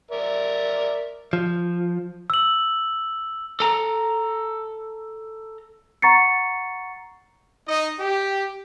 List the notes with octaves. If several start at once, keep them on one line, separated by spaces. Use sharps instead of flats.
A#4 D5 E5
F3
E6 F#7
A4 A#5
F#5 A#5 C#6 A6 C7 C#7
D#4 D#5
G4